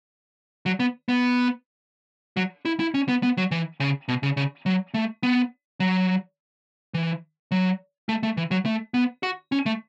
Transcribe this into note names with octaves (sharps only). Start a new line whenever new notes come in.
F#3
B3
B3
F#3
E4
E4
C#4
B3
B3
F#3
E3
C#3
B2
C#3
C#3
F#3
A3
B3
F#3
E3
F#3
A3
A3
E3
F#3
A3
B3
F#4
C#4
A3